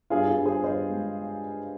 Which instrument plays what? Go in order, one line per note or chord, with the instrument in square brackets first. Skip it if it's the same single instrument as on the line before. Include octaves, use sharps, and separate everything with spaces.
[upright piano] G2 F4 G#4
F4 G#4
G2
G#4 C5
G2 C5 D#5
G#3